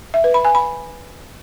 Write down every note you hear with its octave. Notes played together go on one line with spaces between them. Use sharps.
E5
B4
B5
G#5
B5